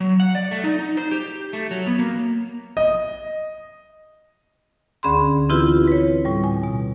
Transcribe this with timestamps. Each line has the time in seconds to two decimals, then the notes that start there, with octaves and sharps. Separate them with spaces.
0.01 F#3
0.20 F#5
0.35 D5
0.51 A3
0.64 D#4
0.79 D#4
0.97 C5
1.11 G4
1.53 A3
1.71 F#3
1.87 B3
1.99 A#3
2.77 D#5
5.03 D2 D3 C#4 G#4 B5 C6
5.49 E3 C4 E4 F4 G4 B4
5.88 B4 C#5
6.25 A2 G3
6.44 G#5
6.63 B2